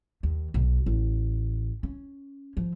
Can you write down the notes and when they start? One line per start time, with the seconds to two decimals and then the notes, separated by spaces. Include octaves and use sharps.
0.23 D#2
0.54 B1
0.86 A1
1.83 C#4
2.57 F3